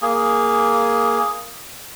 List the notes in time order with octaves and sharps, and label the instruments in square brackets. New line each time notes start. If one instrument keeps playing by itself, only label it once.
[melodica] A#3 G#4